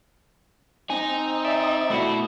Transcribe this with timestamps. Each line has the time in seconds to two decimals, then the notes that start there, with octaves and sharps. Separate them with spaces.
0.90 C4 D#4 G#5
1.45 D5 E5
1.90 B2 A3 E4 F#4